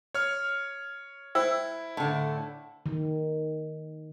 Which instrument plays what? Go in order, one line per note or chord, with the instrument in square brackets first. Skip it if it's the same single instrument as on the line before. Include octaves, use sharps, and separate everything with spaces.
[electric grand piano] C#5 F6
[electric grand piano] E4 [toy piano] C5 G5 E6
[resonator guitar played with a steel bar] A2 D3
[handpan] D#3